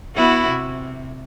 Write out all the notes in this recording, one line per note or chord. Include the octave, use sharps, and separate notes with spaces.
B3 E4 F#4
C3